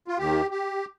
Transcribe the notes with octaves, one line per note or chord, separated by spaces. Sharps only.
F4
D#2 D#3 G4
G4